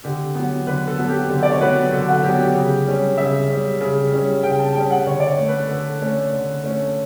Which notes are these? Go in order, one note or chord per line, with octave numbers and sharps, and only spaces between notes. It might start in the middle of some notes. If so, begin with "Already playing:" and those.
D3 G4
F#3 B3
D3 B4
A4
F#3 B3
G4
D3 A4
D5
C#5
F#3 B3 B4
D3 A4
F#4
F#3 B3 G4
G4
C#3
G3 C#4
C#3 E5
G3 C#4
C#3
G3 C#4
C#3 G5
A5
G3 C#4 G5
F#5
D3 C#5
D5
C#5
A3 C#4
B4
D3 A4
A3 C#4
D3
A3 C#4